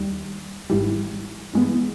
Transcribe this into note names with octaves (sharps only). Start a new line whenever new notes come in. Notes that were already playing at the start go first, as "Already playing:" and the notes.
Already playing: D#2 D#3 G3
G#1 G#2 E3 G3
G2 E3 G#3 B3